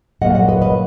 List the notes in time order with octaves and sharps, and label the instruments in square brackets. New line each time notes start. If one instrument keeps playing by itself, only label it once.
[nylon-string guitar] A#2 F#3 A#3 D#5 F#5
D#5 F#5
B4 D#5
B4 D#5